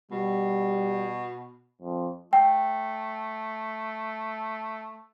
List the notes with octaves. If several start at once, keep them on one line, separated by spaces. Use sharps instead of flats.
B2 G3
F2
A3 G5